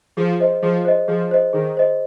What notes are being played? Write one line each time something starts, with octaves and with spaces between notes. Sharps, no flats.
F3 G#4
C5 D#5
F3 G#4
C5 D#5
F3 G#4
C5 D#5
D#3 G#4
C5 D#5